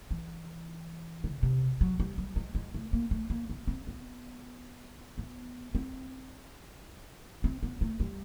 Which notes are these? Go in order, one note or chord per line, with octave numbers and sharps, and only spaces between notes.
E3
C#3
C3
F#3
G3
G3
G#3
G#3
A3
A#3
A3
A#3
B3
C4
B3
B3
C4
C4
B3
A3
G3